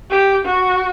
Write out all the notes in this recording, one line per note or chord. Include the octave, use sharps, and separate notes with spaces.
G4
F#4